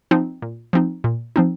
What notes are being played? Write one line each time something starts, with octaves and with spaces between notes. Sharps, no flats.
F3 C4 D#4
A#2
F3 C4 D#4
A#2
F3 C4 D#4